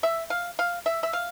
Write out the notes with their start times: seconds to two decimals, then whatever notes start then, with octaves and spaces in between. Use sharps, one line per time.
0.03 E5
0.30 F5
0.59 F5
0.86 E5
1.03 E5
1.13 F5